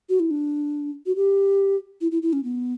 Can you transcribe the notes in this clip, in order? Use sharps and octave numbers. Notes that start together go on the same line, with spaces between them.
F#4
E4
D4
F#4
G4
E4
E4
E4
C#4
B3